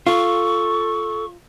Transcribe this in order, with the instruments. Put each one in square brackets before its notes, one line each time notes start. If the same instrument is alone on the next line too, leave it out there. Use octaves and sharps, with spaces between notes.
[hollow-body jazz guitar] F4 [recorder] A4 [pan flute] C#6